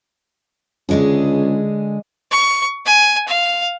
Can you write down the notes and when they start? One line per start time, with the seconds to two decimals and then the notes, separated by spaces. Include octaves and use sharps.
0.89 C#2 D3 G#3 G#4
2.31 C#6
2.85 G#5
3.28 F5